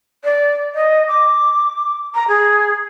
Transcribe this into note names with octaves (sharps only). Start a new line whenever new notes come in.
D5
D#5
D6
A#5
G#4